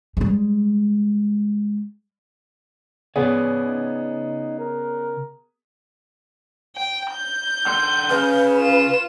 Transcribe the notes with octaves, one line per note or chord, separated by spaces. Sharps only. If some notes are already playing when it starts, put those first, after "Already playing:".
G3 G#3
C#3 B3 G#4 C#5 D5
D#4
A#4
G5
G6
D3 C6
C#3 B4
F4 E7